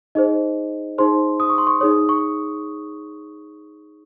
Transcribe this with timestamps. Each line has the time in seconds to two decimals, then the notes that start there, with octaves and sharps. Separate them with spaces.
0.15 D#4 G#4 C5 D#5
0.98 D#4 G#4 C5 C6
1.40 D#6
1.50 C#6
1.58 C6
1.67 C#6
1.81 D#4 G#4 C#5 D#6
2.09 C#6